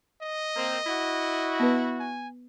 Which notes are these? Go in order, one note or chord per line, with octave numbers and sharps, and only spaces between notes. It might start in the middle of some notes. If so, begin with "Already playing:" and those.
D#5
A#3 C4
E4 F#4
B3 B4
G#5